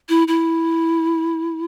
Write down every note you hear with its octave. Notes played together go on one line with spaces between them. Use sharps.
E4
E4